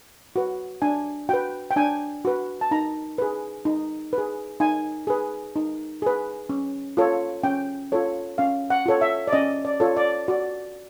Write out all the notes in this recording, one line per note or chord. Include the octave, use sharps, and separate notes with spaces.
F#4 B4
D4 G#5
F#4 B4 G5
G5
D4 G#5
F#4 B4
A5
D#4 A#5
G#4 B4
D#4
B4
G#4
D#4 G#5
G#4 B4
D#4
G#4 B4
C#4
F4 A4 C#5
C#4 G5
F4 A4 C#5
C#4 F5
F#5
F4 A4 C#5
E5
D5
C#4 D#5
D5
F4 A4 C#5
D5
F#4 D5